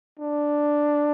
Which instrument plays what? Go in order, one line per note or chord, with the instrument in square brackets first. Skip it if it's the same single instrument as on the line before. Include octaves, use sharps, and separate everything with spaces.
[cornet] D4